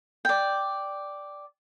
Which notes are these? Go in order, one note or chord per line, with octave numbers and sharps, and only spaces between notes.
D5 G5